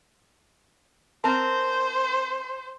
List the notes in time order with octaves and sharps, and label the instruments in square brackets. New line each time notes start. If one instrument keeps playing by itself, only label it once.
[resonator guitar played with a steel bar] C4 A#4 [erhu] C5 [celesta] A5